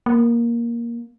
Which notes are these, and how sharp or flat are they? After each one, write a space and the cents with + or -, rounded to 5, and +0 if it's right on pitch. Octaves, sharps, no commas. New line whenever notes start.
A#3 +10